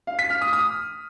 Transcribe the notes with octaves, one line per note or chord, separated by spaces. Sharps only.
F5
B6
F6
D#6
D#6